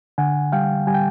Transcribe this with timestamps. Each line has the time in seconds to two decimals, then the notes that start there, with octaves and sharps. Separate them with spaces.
0.18 D3 F#5 G#5
0.52 G3 F5 G5
0.87 G3 G#5
0.94 G5